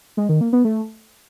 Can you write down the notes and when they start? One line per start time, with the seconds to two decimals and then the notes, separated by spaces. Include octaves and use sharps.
0.17 G#3
0.29 D#3
0.41 A#3
0.53 B3
0.65 A3